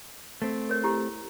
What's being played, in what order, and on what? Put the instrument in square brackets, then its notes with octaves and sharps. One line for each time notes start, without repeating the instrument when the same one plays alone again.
[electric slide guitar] A3 C4
[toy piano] A#4 C#5
E4 G4